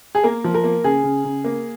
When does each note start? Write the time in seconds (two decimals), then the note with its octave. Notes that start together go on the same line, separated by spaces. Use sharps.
0.15 G#4
0.24 A#3 A#4
0.44 F3
0.54 A#4
0.64 A#3
0.84 C#3 G#4
1.04 C#3
1.25 C#3
1.44 A#3